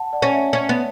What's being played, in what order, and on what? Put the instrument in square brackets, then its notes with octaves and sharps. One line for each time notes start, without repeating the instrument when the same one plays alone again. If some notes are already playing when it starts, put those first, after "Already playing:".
Already playing: [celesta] F#5 A5
D5 F#5
[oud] C#4
[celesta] C#5 E5
[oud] C#4
B3